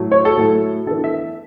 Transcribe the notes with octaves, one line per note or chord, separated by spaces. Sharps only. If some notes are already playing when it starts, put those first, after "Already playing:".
Already playing: A2 F#3 A3
C#5
A4
A2 F#3 A3
E3 B3 D4 A4
E5